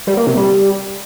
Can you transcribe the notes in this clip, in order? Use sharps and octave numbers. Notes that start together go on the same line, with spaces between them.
G3
A#3
C3
G3